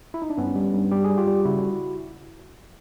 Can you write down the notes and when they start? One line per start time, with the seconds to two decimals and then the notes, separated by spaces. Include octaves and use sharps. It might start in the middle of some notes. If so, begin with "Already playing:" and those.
0.14 E4
0.22 D#4
0.30 D4
0.38 G2 B3 C#4
0.55 G3
0.74 G2
0.91 G3 G4
1.04 G#4
1.10 G3
1.18 F4 G4
1.27 G3
1.45 C#3 E4 F#4